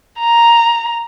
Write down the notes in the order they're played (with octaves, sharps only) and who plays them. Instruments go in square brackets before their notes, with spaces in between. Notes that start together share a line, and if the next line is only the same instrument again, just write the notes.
[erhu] A#5